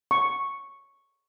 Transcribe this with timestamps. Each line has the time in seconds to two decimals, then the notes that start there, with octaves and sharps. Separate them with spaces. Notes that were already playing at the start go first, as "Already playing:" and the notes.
0.11 C#6